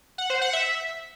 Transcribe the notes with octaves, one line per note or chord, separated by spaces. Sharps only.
F#5
C5
F#5
E5